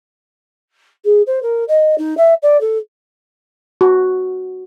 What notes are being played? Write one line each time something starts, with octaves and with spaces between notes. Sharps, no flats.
G#4
C5
A#4
D#5
D#4
E5
D5
A4
F#4